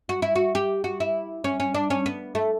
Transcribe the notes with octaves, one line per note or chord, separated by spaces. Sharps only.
F#4
E4
F#4
G4
F#4
E4
C#4
C#4
D4
C#4
B3
A3